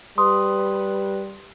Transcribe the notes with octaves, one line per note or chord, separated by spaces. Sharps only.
G3 B4 C6 D#6